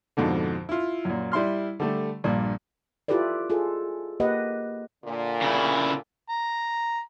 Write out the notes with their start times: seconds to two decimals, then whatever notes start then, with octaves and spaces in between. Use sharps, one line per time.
0.17 F2 G#2 B2 D3
0.69 E4 F4
1.05 F#2 A#2
1.32 G3 E4 C6 F6
1.80 D3 G3 A3
2.24 A#1 G2 A#2
3.08 E4 F4 G4 A4 B4 D5
3.50 F4 G#4 A4
4.20 A#3 G4 B4 D#5 F#5
5.04 A#2 D3
5.42 C#3 E4
6.29 A#5